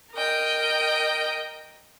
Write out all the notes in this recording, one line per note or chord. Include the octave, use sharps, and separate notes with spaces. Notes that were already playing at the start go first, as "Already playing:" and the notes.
A#4 D#5 G5